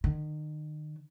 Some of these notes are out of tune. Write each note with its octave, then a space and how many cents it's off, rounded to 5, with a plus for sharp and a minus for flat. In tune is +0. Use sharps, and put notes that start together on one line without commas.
D#3 -35